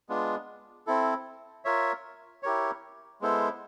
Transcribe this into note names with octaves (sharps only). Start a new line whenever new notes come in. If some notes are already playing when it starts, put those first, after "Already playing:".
G#3 B3 D4 F4
C4 E4 A4
F4 A#4 C#5 E5
E4 G4 A#4 C#5
G#3 B3 E4 A4 C5